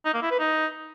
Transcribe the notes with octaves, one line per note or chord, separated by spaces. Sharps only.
D#4
A#3
E4
B4
D#4